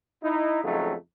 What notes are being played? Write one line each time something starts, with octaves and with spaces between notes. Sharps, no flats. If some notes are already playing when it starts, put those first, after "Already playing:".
D#4 E4
F2 C#3 F#3 G#3 A3 D#4